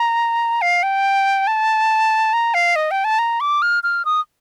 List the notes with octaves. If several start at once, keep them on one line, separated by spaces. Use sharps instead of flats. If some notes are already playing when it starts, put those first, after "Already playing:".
Already playing: A#5
F5
G5
A5
A#5
F5
D#5
G5
A5
A#5
D6
F6
F6
D#6